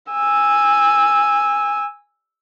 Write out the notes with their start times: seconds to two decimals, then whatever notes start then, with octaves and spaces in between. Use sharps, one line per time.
0.12 G#5 E6